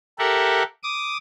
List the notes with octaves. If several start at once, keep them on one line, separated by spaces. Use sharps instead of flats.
G4 A4 A#4 E5 F#5
D6 D#6